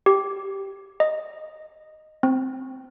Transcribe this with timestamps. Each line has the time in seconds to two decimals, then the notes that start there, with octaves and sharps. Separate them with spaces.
0.06 G4
1.00 D#5
2.23 C4